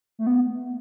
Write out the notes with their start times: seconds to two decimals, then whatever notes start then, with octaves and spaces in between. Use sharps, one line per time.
0.19 A3
0.27 B3